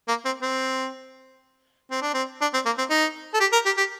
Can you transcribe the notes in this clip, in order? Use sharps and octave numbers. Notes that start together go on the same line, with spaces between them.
A#3
C4
C4
C4
D4
C4
D4
C4
A#3
C4
D#4
A4
G4
A#4
G4
G4